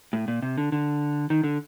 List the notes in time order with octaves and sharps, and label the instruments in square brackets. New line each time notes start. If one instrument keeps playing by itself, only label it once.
[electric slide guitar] A2
A#2
C3
D3
D3
D#3
D3